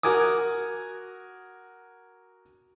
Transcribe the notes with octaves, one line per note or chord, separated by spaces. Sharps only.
F#4 A#4 G#5 D6 D#6